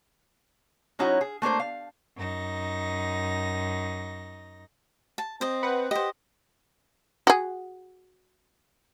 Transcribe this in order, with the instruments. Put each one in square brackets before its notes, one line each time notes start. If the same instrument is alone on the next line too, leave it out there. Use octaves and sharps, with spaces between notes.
[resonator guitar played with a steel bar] F#3 C#4 D#4 E4 F#4
G#4
A3 A#3 D4 C5
F5
[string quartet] F#2 D#4 A#6
[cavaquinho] A5
[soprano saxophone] C4 [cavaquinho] C5 D#5
[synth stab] B4 F#5
[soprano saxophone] G4 [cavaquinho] C5 D#5
[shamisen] F#4 G#4